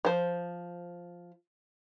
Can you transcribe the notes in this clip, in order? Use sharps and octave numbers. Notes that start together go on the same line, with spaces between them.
F3 C5